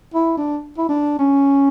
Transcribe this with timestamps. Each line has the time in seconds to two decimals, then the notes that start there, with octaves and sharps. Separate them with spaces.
0.14 E4
0.37 D4
0.78 E4
0.89 D4
1.19 C#4